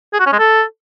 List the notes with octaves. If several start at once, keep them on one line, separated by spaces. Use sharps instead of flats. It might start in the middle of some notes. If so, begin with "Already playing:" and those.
G#4
F#4
C#4
G#3
A4